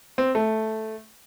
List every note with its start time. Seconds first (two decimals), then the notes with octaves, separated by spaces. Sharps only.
0.18 C4
0.35 A3